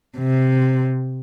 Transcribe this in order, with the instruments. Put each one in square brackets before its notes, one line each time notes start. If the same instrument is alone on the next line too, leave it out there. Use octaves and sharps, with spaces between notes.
[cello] C3